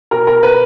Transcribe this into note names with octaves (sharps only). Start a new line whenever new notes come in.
B2 A#4
A#4
B4